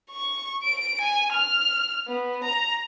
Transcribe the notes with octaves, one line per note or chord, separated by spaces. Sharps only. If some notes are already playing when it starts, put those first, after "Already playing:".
C#6
D7
G#5
F6
B3
A#5